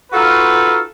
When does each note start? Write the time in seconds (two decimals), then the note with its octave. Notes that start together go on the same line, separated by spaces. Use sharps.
0.12 D#4 F4 F#4 A4 B4 F5